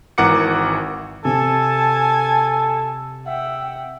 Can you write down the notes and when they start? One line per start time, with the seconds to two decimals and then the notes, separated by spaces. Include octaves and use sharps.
0.18 G#1 E3 A#4 F#5 D6 C#7
1.25 C3 A4 G#5 A5
3.27 E5 F#5 G5